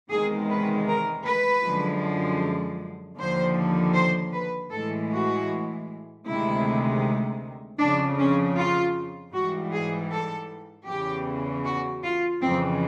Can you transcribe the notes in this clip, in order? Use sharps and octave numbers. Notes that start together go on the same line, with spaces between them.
E2 C3 D#3 G#3 G#4
B4
A#4
B4
F#2 D3 F3 G#3
D#2 D3 F3 C5
C5
B4
A2 E3 G#3 A4
F#4
D2 C3 D#3 G#3 E4
F2 C#3 F3 D4
C#4
F4
G#2 E3 G3 F#4
G#4
A4
E2 C#3 E3 G4
F#4
F4
F2 C#3 E3 C4